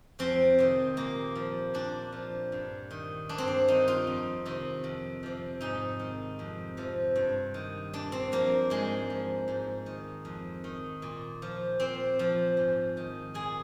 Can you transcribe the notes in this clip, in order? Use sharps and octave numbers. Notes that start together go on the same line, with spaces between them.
F2 C4
C3 D#3
A#2 A#3
F3
A#2 D4
F3
G2
D#3
G2 D4
C4
D4
D#3 D#4
F4
F2
C3 D#3
F2
C3 F3
G#2 D#4
D#3
F2
C3 F3
G2
D#3
A#2 D4
C4
F3 A#3
G#2 G#3
F3
G#2
D#3
F2
D#3
A#2
F3
A#2 C4
F3
G#2
D#3
A#2 G#4